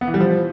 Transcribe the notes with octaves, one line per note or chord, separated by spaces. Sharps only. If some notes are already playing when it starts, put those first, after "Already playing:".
B3
E3
G3
F3